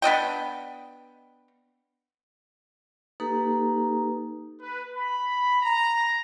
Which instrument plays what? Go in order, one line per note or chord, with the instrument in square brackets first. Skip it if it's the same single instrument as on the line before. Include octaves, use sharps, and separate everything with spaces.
[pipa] B3 D4 D#5 G5
[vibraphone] A#3 D#4 G4 A4 B4 A#5
[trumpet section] B4
B5
A#5